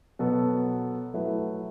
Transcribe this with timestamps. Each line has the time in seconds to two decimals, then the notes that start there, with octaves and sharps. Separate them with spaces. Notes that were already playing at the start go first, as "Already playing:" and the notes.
0.19 B2 F#3 B3 F#4 A4
1.14 F#3 A3 E4 B4